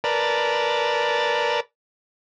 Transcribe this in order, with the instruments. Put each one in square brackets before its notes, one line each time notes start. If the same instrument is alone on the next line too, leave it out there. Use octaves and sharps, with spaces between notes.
[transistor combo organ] A#4 B4 D5 A5